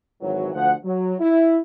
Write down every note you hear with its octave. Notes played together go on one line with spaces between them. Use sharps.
G#1 E3 F#3
D2 F3 F#5
F#3
E4